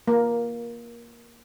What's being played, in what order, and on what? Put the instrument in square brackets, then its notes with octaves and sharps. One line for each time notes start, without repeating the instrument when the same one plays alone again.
[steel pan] A#3